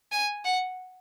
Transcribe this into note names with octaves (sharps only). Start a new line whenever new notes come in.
G#5
F#5